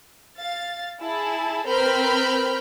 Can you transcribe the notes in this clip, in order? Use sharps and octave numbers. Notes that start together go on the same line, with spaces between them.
F5 A6
E4 G#4 A5
C4 A#4 B4 B5 F6 G6